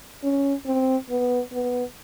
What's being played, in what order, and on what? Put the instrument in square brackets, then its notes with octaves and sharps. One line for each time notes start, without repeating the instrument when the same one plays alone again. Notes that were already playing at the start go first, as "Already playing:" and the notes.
[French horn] C#4
C4
B3
B3